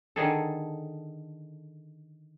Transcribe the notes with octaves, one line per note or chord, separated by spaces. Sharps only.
D3 D#3 G#4 A4